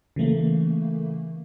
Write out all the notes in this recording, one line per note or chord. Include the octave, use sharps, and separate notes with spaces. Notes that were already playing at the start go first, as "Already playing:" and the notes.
C#3 E3 A3 A#3